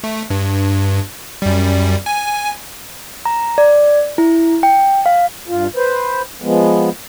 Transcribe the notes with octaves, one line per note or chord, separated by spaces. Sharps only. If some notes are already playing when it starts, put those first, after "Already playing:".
A3
G2
F#2 G3
G#5
A#5
D5
E4
G5
F5
G2 F4
B4 C5
F3 G#3 B3